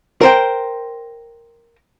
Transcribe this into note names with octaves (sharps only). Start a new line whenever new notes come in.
A#4 C5 G5